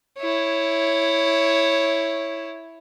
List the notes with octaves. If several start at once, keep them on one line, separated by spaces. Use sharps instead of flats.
E4 C#5